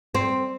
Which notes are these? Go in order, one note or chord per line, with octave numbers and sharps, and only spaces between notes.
C4